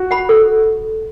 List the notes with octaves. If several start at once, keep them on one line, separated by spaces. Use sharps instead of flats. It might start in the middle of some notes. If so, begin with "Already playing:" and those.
Already playing: F#4
F#5 B5
A4